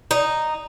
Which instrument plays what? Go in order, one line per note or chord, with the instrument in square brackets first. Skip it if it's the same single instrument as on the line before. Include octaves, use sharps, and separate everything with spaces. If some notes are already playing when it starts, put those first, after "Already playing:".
[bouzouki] D#4